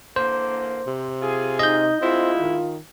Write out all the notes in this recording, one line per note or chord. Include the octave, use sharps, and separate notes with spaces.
D3 E3 A#3 C5
C3
F4 G#4
D#4 D#5 G6
D2 G#3 C4 E4 F4
D#3